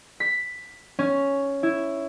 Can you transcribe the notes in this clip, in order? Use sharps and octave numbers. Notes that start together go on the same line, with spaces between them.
B6
C#4
E4